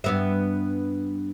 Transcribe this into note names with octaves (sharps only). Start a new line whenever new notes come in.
G2 B3 E5